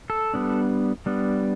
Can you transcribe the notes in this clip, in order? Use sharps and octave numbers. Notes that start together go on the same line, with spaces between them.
A4
G3 B3 D4
G3 B3 D4